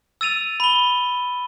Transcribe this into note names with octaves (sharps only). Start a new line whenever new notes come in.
E6 A6 D#7 F7
B5 G7